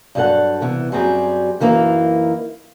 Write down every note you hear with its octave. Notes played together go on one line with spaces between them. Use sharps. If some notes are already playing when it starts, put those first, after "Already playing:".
G2 F#3 G3 G#4 A4 F#5
C3 E3 B3
F#2 F#3 G3 C4 G4 G#4
F#2 E3 A#3 D#4 E4